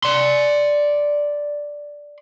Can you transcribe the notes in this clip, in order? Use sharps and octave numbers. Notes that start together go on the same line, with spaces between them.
D5 C6